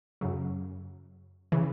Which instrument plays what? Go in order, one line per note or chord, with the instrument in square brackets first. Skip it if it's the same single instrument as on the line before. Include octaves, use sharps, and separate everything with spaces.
[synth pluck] F#2 C#3 F#3
C#3 E3